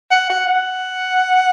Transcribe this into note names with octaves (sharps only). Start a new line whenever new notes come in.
F#5
F#5
F#5